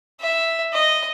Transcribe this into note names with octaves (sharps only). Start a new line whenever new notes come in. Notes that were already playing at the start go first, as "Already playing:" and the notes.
E5
D#5